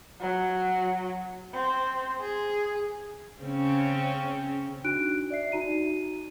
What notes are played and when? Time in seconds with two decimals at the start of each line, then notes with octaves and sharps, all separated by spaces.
0.21 F#3
1.54 C4
2.21 G#4
3.42 C#3 C4 C#4
4.84 D4 D#4 F#4 F#6 D7
5.30 D5 E5 C7
5.52 D#4 F#4 A#5 D#7